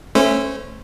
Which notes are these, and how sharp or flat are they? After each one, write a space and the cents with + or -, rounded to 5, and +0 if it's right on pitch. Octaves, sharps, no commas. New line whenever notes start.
A3 +0 C#4 -20 C5 -30